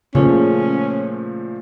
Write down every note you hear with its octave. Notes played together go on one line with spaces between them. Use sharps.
A#2 C#3 F3 A3 C#4